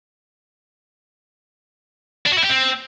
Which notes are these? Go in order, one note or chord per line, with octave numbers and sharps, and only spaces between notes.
D4
F#4
E4
G4
C4